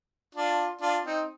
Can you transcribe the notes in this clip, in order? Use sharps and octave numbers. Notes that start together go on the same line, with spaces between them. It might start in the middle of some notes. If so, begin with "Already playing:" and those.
D4 F4
D4 F4
C4 D#4